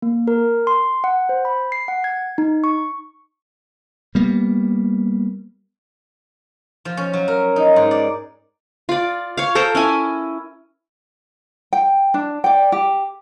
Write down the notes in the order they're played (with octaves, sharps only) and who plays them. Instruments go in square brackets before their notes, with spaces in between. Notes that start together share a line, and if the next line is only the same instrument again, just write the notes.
[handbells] A#3
A#4
C6
F#5
C5
B5
C7
F#5
G#6
D#4
C#6
[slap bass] G3 A#3 B3
[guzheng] F3
C#4
F#3
A#4
D#4
G#2
D5
[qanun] F4 D5
C#5 F5
A4 A#4 C5 A#5
C#4 E4 G#5
[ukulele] G5
D4
D5 G5
G4